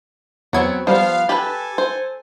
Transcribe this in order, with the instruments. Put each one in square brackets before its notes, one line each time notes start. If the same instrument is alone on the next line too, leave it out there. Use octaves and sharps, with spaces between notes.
[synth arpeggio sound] E2 G#6 [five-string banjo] F#3 B3 C4
[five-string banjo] F3 B3 [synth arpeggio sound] G3 C5 [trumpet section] F5
[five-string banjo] G4 B4 [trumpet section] A4 G#5 A5 [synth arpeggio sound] B5
[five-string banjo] C5